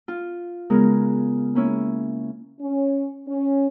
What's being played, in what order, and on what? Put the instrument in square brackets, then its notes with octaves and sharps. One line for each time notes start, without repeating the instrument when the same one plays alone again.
[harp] F4
C#3 G#3 B3 A#4
A#3 C#4 E4
[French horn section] C#4
C#4